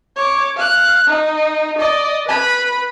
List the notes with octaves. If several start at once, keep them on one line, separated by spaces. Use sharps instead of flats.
C#5 D6
F5 F#6
D#4
D5 D#5
B4 B5